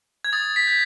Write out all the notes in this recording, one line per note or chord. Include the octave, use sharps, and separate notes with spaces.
G#6
D#6 A6
B6
G6